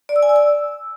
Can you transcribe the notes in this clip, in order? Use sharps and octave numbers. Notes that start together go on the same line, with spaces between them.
D5
E6
G#5
D5
E6